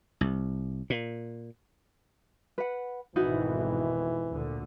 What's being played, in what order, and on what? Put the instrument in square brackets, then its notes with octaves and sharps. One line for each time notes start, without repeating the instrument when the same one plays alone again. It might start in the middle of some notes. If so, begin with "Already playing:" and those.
[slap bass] C2
A#2
[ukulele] B4 F#5
[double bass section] G#1 F2 B2 [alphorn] E3 [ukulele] D#4 E4 F#4
[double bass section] D2 A#2 D3